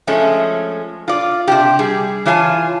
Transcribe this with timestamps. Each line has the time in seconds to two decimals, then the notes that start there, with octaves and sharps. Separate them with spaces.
0.07 F3 G#3 A3 C#4
1.08 F4 D5
1.48 C3 D4 G4
1.79 G3 G#4
2.25 E3 F4 C#5 G#5 A5